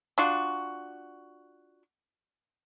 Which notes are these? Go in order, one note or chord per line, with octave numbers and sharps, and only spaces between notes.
D4 F4 F#4